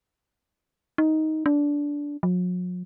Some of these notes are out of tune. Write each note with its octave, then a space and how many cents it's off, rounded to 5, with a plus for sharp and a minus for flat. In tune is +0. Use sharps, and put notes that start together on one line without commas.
D#4 +10
D4 -15
F#3 -45